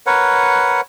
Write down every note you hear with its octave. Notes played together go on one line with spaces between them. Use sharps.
A#4 B4 C#5 F#5